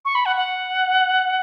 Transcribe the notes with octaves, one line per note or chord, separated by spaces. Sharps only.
C#6
B5
F#5
F#5